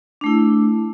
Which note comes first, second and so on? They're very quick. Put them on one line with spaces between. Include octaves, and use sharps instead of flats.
D4 A3 E4